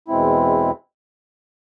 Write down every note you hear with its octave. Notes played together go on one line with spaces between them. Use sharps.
E2 B2 G#3 C4 E4